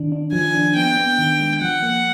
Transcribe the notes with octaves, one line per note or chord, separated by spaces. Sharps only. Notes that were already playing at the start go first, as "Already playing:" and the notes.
Already playing: D#3 D4
D4
F3 G#5
D4
B3 G5
B3
D#3
G#3
F3 F#5
A#3